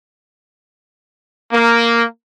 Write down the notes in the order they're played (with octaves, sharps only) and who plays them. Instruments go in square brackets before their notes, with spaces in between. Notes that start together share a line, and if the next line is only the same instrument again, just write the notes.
[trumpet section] A#3